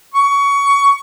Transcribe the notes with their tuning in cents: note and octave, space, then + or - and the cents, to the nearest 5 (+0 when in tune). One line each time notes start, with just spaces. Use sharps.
C#6 +20